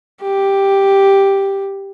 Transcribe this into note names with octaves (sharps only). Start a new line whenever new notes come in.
G4